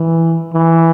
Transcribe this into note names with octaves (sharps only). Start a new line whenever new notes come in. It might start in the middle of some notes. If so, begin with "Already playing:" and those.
Already playing: E3
E3